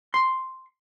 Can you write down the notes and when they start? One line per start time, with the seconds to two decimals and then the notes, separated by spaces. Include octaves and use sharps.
0.14 C6